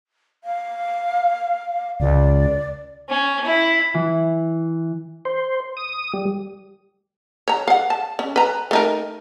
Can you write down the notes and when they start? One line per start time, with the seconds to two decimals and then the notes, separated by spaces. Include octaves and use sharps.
0.44 F5
2.00 C#2 D5
3.10 C#4
3.44 E4
3.94 E3
5.25 C5
5.77 D#6
6.14 G3
7.48 C#5 A#5
7.68 F5 F#5
7.90 A5
8.19 C#4
8.36 B4 A#5
8.71 A3 D#4 A#4